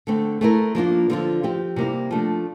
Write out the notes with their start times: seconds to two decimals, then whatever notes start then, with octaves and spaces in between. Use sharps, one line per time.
0.07 D3 A3 C4
0.41 A3 C4 E4 A#4
0.75 F3 A#3 D4 F4
1.10 D3 F3 C4 F4
1.43 F3 C4 G4
1.76 C3 G3 A#3 E4
2.11 F3 A3 D4